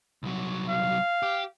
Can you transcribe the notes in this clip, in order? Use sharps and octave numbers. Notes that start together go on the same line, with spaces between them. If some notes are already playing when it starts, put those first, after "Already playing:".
C2 F#3
F5
G4